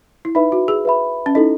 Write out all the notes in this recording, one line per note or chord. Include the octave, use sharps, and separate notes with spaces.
E4
D#4 B4 E5 B5
F#4
G#4
B4 E5 B5
C#4
D#4 E4 A4 D#5